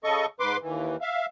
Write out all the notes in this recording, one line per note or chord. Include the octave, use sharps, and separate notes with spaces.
C#3 A4 D#5 C#6
G#2 B4 C6 D6
D#2 E3
E5 F5